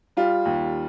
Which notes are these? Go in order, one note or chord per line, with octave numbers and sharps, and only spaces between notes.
G3 F4
D#2